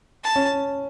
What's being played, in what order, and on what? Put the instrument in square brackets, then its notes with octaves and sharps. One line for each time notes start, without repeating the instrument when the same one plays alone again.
[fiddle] A5
[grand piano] C#4